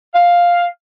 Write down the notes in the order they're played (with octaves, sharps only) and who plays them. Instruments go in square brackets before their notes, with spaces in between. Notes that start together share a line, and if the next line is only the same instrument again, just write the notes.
[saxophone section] F5